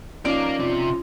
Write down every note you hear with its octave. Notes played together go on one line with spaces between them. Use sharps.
F3 C#4 D#4 A#4 D5 F5
C3 C4 F4